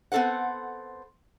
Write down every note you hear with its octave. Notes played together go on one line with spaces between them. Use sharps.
B3 C4 A4 C5 F#5